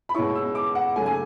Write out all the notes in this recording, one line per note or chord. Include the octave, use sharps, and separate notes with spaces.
B5
B2 G#3 C#4 E4 C#6
E6
D6
F#5
C#3 F#3 A3 G#5
G#5